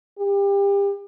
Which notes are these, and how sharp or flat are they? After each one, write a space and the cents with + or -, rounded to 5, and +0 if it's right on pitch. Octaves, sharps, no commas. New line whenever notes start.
G4 +30